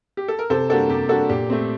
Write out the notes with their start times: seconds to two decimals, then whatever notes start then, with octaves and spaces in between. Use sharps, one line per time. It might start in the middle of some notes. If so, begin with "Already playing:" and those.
0.17 G4
0.28 A4
0.39 A#4
0.50 C3 A4 C5
0.69 G3 A#3 D4 F#4 A4
0.90 C3 G4
1.09 G3 A#3 D4 F#4 A4
1.29 A#2 G4
1.50 A3 C4